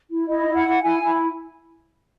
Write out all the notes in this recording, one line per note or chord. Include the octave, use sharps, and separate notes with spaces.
E4
E4 D#5
E4
F#5
E4
E4 G#5
E4